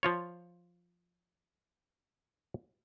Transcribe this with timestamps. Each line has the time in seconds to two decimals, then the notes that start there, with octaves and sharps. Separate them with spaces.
0.03 F3 F4 C#5